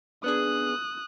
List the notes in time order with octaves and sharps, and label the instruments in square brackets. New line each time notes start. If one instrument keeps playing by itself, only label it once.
[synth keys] B3 D4 G#4 [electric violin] D#6 F#6